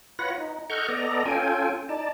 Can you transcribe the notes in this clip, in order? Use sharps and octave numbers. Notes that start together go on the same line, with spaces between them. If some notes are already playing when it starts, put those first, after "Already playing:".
F4 B4 C#5 F#5 B5 A#6
D#4
A4 D#5 F#5 C#6 F6 G6
B3 A4 D5 D#5 A#5
C#4 F4 A4 G5 G#5
D#4 D5 A5